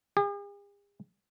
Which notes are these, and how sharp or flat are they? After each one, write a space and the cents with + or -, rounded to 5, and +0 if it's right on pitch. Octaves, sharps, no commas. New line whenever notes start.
G#4 -45